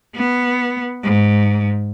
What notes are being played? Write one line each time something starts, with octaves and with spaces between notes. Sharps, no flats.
B3
G#2